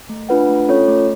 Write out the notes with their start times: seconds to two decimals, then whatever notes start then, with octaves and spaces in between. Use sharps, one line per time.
0.09 A3
0.29 D4 F4 B4 F#5
0.49 A3
0.69 C#4 F4 A4 C#5
0.88 A3